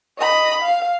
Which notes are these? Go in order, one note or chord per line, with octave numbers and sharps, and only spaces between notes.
D#5 B5
F5